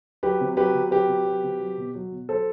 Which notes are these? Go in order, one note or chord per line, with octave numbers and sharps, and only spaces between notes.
F#3 G4 B4
C3
F#3 G4 B4
C3
F#3 G4 B4
C3
F#3
C3
F#3
B2
F#3
B2
F#3 A4 C5